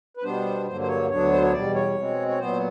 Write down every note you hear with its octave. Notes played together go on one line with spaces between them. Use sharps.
B4
B2 G3 B3 D4 C5
G2 D3 F#3 A#3 C5
C5
C#5
D2 D3 F#3 B3 D4 C#5
C5
C#5
E2 B2 G3 D5
C#5
B2 G#3 C4
C#5
A#2 F#3 B3 C5